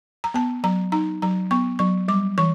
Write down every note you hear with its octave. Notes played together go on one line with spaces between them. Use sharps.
A#5
B3 A5
F#3 A#5
D#4 A#5
F#3 A#5
B3 C#6
F#3 C#6
G3 D6
E3 C#6